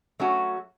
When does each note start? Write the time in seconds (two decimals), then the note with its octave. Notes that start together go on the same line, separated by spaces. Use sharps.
0.20 F#3 A3 C#4 F#4